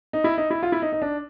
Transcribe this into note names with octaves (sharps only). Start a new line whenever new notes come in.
D#4
E4
D#4
E4
F4
E4
D#4
D#4
D4